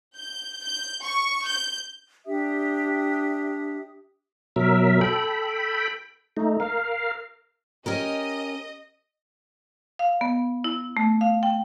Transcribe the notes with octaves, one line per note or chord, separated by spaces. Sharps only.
G6
G6
C#6
G6
D4 G4 E5 D#6
B2 F#3 A#4 E5
A4 G5 B5
A3 D#4
A#4 F5
C#4 G4 A#4 D#5
F5
B3
E4
A3
F5
G5